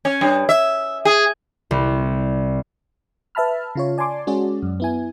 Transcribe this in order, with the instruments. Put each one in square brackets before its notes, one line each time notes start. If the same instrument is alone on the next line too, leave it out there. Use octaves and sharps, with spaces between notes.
[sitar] C#4
G2
E5
G#4
[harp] C2
[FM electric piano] B4 E5 A5 B5 F6
C#3 F4 C#5
D5 G#5 A5 C6 D6
G#3 C#4 F#4 G#4 D5
F#2
B3 E4 G#5